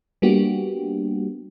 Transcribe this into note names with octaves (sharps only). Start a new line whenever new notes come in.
G3 A#3 B3 D4 F#4 G4